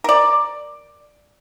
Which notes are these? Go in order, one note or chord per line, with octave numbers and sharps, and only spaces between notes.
A#4 D5